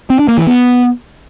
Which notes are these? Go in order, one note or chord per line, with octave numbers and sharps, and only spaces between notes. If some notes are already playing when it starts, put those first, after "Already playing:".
C4
D4
A#3
E3
B3